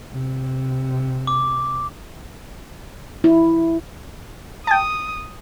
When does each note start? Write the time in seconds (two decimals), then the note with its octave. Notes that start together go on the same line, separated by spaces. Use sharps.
0.14 C3
1.27 D6
3.24 E4
4.67 G5 A5 D#6